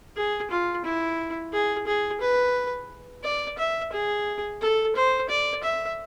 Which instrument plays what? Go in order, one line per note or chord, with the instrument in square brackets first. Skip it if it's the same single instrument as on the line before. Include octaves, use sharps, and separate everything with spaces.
[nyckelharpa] G#4
F4
E4
G#4
G#4
B4
D5
E5
G#4
A4
C5
D5
E5